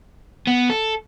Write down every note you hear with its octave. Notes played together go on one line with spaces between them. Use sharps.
B3
A4